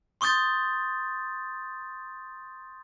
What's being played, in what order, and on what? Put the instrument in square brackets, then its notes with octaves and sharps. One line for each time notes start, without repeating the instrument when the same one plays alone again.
[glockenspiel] C6 C#6 D#6 G6 A6